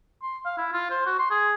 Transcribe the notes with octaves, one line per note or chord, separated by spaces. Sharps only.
C6
F5
E4
F4
C5
F#4
C6
G#4